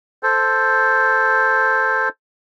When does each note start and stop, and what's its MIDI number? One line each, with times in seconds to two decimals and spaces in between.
0.23 2.09 69
0.23 2.09 72